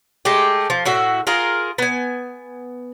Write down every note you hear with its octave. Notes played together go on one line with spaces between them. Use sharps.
G#3 A3 G4
F3
A2 F#4 E5
F4 G#4 A#4
B3 G#5